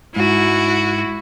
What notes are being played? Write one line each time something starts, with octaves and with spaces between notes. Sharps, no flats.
G#2 E4 F#4